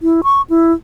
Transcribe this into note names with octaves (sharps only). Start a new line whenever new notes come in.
E4
C#6
E4